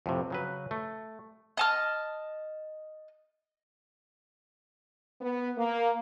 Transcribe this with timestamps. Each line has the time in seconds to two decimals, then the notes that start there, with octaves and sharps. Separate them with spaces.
0.06 F2 A2 C3
0.30 C#3 F#3 B4
0.71 A3
1.57 D#5 A5 F6
5.21 B3
5.57 A#3